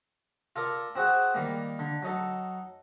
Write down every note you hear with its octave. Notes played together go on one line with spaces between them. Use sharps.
F4 A4 A#4 D5
C4 F#4 G#4 F#5
D#3 G3 A#3
D3
F#3 D#4 A4